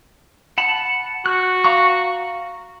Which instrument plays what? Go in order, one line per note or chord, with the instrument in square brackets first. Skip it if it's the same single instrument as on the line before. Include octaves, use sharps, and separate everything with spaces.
[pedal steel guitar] F#5 A5 B5
[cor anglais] F#4 [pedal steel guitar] F#6
[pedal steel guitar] F5 A#5 C#6